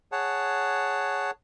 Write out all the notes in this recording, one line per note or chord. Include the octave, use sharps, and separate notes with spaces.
G#4 C#5 F#5 A5